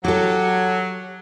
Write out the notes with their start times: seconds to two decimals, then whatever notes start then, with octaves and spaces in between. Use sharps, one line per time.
0.05 F#3 G4 A4